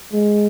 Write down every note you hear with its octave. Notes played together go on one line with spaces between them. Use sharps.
G#3